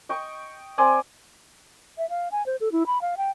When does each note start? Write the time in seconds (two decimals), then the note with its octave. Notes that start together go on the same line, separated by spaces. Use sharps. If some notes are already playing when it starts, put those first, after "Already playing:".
0.09 D#5 G5 C#6
0.78 C4 D5 G#5 C6
1.98 E5
2.09 F5
2.32 G#5
2.46 C5
2.60 A4
2.72 E4
2.86 B5
3.01 F5
3.17 G5